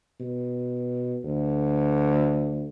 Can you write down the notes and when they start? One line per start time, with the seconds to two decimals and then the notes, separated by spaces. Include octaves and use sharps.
0.20 B2
1.24 D2